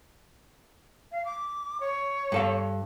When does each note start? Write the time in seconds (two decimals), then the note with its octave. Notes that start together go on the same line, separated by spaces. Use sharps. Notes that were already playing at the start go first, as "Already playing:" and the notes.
1.12 F5
1.25 D6
1.80 C#5
2.32 G2 A4 F5